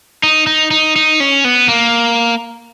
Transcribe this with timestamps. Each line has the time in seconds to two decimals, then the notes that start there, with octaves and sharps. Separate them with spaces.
0.23 D#4
0.47 D#4
0.71 D#4
0.96 D#4
1.20 C#4
1.45 B3
1.68 A#3